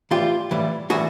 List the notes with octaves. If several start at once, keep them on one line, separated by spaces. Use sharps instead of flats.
A2 E3 G3 F4 G4
A2 E3 G3
A2 E3 G3 F#4 G#4